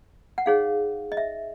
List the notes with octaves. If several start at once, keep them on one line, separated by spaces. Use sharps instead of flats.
F#5
D#4 G#4 C#5 F5
D#5
E5